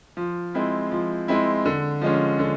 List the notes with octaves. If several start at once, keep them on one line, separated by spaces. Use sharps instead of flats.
F3
G#3 C4 E4
F3
G#3 C4 E4
D3
F3 G#3 C#4
D3